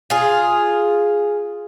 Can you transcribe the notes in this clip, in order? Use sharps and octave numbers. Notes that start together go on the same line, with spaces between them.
F4 G#4